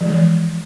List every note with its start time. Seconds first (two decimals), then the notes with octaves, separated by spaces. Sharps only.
0.01 F3
0.05 G#3
0.10 E3